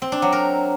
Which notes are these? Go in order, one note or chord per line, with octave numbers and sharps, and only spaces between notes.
C4
D4
F#3
A#4